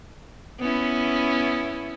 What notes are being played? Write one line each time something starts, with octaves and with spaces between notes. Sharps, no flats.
B3 C#4 E4